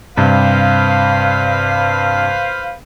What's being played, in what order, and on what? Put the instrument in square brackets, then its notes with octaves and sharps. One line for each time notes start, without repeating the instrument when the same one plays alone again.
[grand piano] G2 C3 [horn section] B4 C5 F5